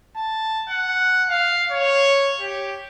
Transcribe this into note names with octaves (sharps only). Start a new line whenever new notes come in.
A5
F#5
F5
C#5
G4